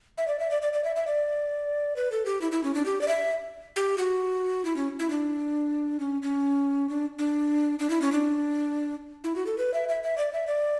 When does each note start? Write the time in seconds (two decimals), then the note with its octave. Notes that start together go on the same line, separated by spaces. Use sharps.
0.18 E5
0.28 D5
0.39 E5
0.50 D5
0.62 D5
0.73 D5
0.84 E5
0.96 E5
1.07 D5
1.96 B4
2.12 A4
2.25 G4
2.41 E4
2.52 E4
2.63 C#4
2.75 D4
2.85 G4
3.01 D5
3.08 E5
3.76 G4
3.98 F#4
4.65 E4
4.76 C#4
4.99 E4
5.10 D4
6.00 C#4
6.22 C#4
6.89 D4
7.18 D4
7.79 D4
7.90 E4
8.01 C#4
8.12 D4
9.24 E4
9.36 F#4
9.46 A4
9.58 B4
9.74 E5
9.89 E5
10.03 E5
10.17 D5
10.33 E5
10.47 D5